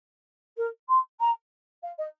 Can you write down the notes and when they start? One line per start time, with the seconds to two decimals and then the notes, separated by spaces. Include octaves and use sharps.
0.57 A#4
0.88 C6
1.20 A#5
1.82 F5
1.98 D#5